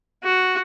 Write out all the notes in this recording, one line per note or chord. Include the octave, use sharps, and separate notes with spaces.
F#4